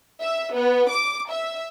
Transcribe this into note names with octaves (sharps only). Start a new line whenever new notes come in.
E5
B3
D6
E5